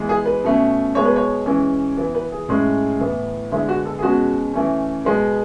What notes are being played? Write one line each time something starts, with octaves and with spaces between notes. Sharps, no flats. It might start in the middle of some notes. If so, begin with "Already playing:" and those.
Already playing: E3 G#3 B3
G#4
B4
B2 A3 C#4
B2 G#3 B3 C#5
B4
C#5
E3 G#3 C#4
E3 B3
B4
G#4
A2 G#3 C#4
A2 E3 B3
D3 G#3 B3 E4
F#4
A4
G#4
B2 G#3 C#4 F#4
E3 A3 C#4
B2 G#3 B3